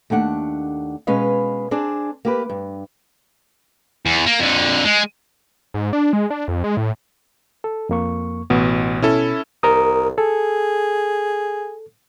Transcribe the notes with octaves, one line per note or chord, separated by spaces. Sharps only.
D#2 A3 D4 F#5
B2 G#3 C#4 B4 D#5 F5
C4 D4 G#4 D5
A#3 G4 B4
G2
E2
A#3
F2 D3
G#3
G#2
D4
G#3
D4
F2
G#3
A2
A4
F2 A#3 C#6
A1 B2 B3
B2 C#4 E4 A4
C2 A#4 A#5 D#6
G#4 A4